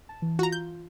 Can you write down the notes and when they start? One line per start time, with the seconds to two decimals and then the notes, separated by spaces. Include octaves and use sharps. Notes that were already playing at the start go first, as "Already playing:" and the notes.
0.09 A5
0.22 E3
0.39 F4 F#4 A#5
0.52 G6